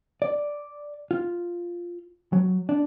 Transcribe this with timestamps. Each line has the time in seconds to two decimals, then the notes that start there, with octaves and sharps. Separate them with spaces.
0.22 D5
1.11 F4
2.33 F#3
2.69 D4